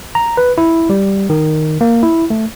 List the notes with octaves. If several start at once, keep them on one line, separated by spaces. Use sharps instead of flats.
A#5
B4
E4
G3
D#3
A#3
E4
A3